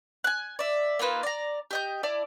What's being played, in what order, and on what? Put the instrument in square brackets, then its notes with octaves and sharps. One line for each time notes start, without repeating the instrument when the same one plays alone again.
[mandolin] G#5 F#6
D5 E5
A#3 D#4 F4 B4
D5 A#5
G4 D#5 G6
E4 D5 A5